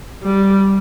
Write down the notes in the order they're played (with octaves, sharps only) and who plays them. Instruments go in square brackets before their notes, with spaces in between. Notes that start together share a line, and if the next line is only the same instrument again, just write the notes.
[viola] G3